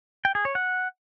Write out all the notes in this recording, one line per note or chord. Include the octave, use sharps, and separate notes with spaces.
G5
G#4
C#5
F#5